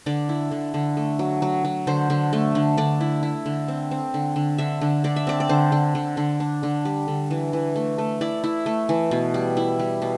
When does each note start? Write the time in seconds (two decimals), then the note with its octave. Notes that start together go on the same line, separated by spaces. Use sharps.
0.06 D3 D5
0.29 E4
0.51 D3
0.74 D3
0.97 A3
1.19 F#3
1.42 F#3
1.65 F#3
1.87 D3 C5
2.10 D3
2.33 A3
2.55 D3
2.77 D3 D5
3.01 E4
3.23 E4
3.46 D3
3.68 C4
3.91 C4
4.14 D3
4.36 D3
4.58 D3 E5
4.81 D3
5.04 D3 D5
5.16 E5
5.27 C4 D5
5.40 D5
5.49 D3 C5
5.72 D3
5.95 D3
6.17 D3
6.40 D4
6.63 D3
6.85 G3
7.08 D3
7.31 E3
7.53 E3
7.76 A3
7.98 A3
8.21 E4 D5
8.44 E4
8.66 A3
8.89 E3
9.11 B2
9.34 G3
9.57 E4
9.79 G3
10.02 B2